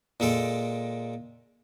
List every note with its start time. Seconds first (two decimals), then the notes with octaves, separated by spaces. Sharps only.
0.20 A#2 G#3 A4 G5